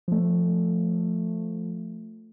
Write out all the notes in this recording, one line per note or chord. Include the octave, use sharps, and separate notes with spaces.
F3 A3